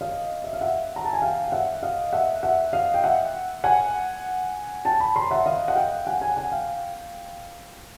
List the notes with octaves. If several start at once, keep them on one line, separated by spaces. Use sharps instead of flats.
D#5 F5
E5
F5
E5 F#5
A#5
A5
G#5
F5 G5
G5
E5 F#5
D#5 F5
E5 F#5
E5 F#5
D#5 F5
G5
E5 F#5
F#5 G#5
G5 A5
A5 B5
A#5 C6
E5 F#5
D#5 F5
F#5
F5 G5
F#5 G#5
F#5 G#5
F#5 G#5
F5 G5